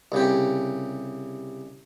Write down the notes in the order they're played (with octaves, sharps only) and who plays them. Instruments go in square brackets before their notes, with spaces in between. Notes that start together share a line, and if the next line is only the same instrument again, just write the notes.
[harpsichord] C2 C#3 G4